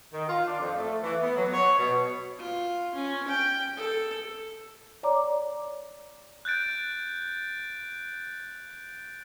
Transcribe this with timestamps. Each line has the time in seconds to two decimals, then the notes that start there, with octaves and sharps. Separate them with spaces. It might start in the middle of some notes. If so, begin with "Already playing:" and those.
0.13 D#3
0.28 F4
0.47 D4
0.59 F2
0.77 A3
1.02 E3
1.21 B3
1.37 F#3
1.54 C#5
1.79 B2
2.39 F4
2.95 C#4
3.28 G5
3.77 A4
5.03 C#5 D5 A#5 D6
6.45 F#6 G6 A6 D7